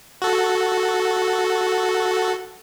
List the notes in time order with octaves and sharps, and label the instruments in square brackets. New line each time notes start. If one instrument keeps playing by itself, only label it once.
[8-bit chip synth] F#4 A4